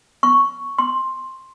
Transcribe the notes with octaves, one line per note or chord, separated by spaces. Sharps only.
C#6
C6